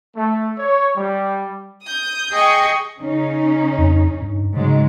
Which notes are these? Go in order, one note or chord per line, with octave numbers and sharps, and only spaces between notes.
A3
C#5
G3
D#6 G6
G#4 D#5 G5 C#6
C#3 C#4 D#4
F2
G2
G#2 C#3 F#3 G#3